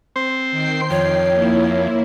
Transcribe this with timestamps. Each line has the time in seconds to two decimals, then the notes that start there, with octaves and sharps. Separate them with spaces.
0.16 C4 C5
0.52 D#3 G5 C7
0.91 F2 C#5
1.32 A#3 E4